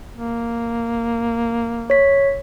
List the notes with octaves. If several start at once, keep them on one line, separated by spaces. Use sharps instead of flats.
A#3
C#5 B6